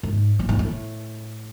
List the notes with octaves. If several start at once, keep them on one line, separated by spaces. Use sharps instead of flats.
G#2
A2
G#2
A2